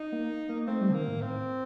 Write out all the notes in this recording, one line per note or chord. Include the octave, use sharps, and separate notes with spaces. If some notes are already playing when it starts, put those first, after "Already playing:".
Already playing: D#4
A#3
A#3
A3 C4
G3
D3
D#3 A#3
A2
A2 C4